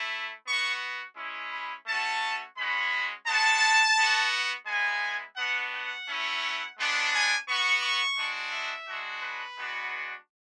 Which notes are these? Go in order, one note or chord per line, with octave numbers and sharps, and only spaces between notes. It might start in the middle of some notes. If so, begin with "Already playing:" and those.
Already playing: A3 E4
B3 F#4 C#6
G#3 C#4 E4
B5
A3 C#4 F#4 A5
G#3 C#4 F#4 B5
G#3 B3 F#4 A5
B3 F#4
G#3 B3 E4 G#5
B3 D4 F#4 F#5
F#5
A3 C#4 E4
G#3 B3 D4
G#5
B3 F#4 C#6
C#6
G#3 D4 F#4
E5
G#3 D4 F#4
B4
G#3 B3 D4 F#4